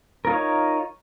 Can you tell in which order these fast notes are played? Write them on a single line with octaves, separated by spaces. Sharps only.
A#4 F4 D#4 C#5